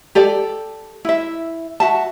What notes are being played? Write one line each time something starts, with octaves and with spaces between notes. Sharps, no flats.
G4 A4 D5
E4 E5
F#4 E5 A5